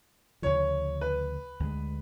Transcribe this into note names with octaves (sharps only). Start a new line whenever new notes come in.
D2 C#3 F3 C#5
B4
D2 D3 G#3